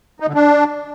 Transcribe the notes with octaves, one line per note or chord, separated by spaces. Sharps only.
D#4
D3
D4